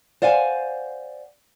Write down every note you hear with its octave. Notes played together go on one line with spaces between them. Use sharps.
C5 D5 F5 F#5 G#5